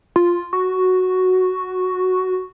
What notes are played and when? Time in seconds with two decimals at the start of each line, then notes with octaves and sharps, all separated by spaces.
0.16 F4
0.53 F#4